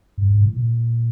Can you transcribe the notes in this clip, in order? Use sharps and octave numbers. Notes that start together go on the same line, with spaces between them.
G2
G#2
A2
A#2